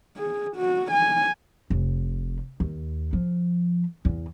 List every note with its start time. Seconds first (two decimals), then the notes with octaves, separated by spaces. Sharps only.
0.17 G#4
0.56 F#4
0.92 G#5
1.70 F1
2.60 D#2
3.13 F3
4.05 E2